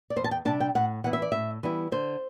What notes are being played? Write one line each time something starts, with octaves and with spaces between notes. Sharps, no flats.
D5
E2 C5
A5
G5
C3 G3 D4 A5
G5
A2 F#5
E3 B3 E4 F#5
E5
D5
A2 E5
E3 G3 B3 E4
D3 C5